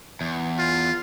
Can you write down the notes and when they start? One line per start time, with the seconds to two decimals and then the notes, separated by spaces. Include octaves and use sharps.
0.21 E2
0.58 F4